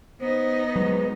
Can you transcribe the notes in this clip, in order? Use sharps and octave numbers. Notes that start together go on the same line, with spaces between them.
B3 D#4 C5
F#3 G#3 B4